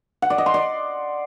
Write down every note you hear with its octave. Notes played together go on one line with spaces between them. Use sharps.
F#5
D5
D#5
C6
D5